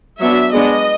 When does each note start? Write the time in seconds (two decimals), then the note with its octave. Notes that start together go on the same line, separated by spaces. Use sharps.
0.20 F#3 B3 D4 E5
0.53 G#3 B3 D4 D#5